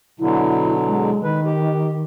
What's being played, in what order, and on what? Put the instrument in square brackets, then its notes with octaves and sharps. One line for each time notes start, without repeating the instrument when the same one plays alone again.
[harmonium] B2 D3 F#3 [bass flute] E4
[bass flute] G#3
[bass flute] D#3 [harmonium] B4
[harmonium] G4